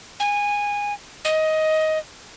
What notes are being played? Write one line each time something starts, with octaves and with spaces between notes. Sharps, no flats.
G#5
D#5